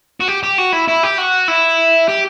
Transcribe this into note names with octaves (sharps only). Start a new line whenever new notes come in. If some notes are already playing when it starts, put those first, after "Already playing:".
F#4
G4
G4
F#4
E4
E4
G4
F#4
E4
G4